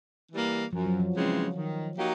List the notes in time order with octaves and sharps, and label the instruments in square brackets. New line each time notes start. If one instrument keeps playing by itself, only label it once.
[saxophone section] E3 G3 A#3
[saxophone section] F#2 [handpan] F3
[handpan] F#3
F3
[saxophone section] C#3 E3 G#3 C4
D#3
F#3 A#3 D#4 G4